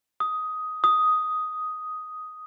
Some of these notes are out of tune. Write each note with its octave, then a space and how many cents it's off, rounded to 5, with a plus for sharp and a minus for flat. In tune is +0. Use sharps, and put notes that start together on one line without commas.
D#6 +10
D#6 +5